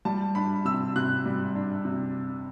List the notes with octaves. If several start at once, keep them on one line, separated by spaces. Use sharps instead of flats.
G3 A5
D4 B5
C3 E6
C3 F#6
G3
D4
C3